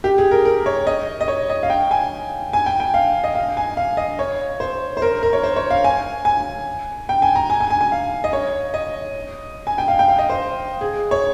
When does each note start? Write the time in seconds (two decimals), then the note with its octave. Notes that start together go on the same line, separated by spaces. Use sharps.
0.04 G4
0.18 G#4
0.31 A#4
0.45 A#4
0.66 C#5
0.87 D#5
1.21 D#5
1.28 C#5
1.49 D#5
1.63 F5
1.70 G5
1.91 G#5
2.53 G#5
2.66 G5
2.80 G5
2.94 F5
3.24 D#5
3.35 F5
3.57 G#5
3.77 F5
3.97 D#5
4.19 C#5
4.60 C5
4.97 C5
5.02 A#4
5.23 A#4
5.33 C#5
5.43 C5
5.56 C#5
5.70 F5
5.84 G#5
6.25 G#5
7.09 G5
7.22 G#5
7.35 A#5
7.50 G#5
7.60 G#5
7.70 G#5
7.81 G#5
7.92 F5
8.24 D#5
8.33 C#5
8.74 D#5
9.67 G#5
9.78 G5
9.88 F5
9.99 G5
10.08 F5
10.19 D#5
10.30 C5
10.81 G#4
11.11 C#5